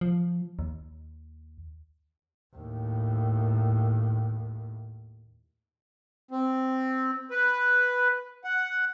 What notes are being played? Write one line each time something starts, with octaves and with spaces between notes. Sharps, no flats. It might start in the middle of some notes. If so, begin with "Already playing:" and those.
F3
D#2
D#2 A2
C4
B4
F#5